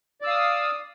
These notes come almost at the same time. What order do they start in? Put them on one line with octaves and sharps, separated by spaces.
D5 E6 F5 D#6